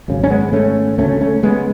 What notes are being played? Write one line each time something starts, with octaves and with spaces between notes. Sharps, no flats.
G#1 F#2 C#3
C#4
G#3 B3
A3 C#4
D2 C#3 A3 C#4
A3 C#4
G#3 B3